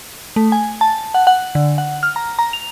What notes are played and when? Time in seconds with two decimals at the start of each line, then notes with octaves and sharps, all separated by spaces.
0.36 A3
0.52 G#5
0.81 A5
1.14 F#5
1.27 F#5
1.55 D3
1.78 F#5
2.03 F6
2.16 A#5
2.39 A#5
2.53 F7